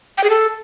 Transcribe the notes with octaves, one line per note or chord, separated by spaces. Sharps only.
G5
G#4
A4